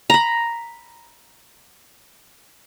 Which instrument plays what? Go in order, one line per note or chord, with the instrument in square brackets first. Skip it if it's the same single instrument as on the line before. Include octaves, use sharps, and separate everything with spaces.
[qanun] A#5 B5